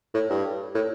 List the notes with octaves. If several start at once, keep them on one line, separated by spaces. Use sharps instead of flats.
A2
G2
A2